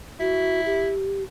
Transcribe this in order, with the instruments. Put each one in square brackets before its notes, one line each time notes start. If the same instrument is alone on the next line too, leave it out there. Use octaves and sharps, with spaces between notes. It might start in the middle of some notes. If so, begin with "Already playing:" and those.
[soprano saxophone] E4 [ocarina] F#4
[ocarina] G4